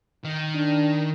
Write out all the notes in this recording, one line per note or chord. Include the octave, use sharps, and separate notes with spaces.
D#3
D4